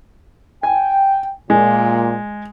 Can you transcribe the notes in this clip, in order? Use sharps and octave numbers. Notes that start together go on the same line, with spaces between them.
G5 G#5
A#2 G#3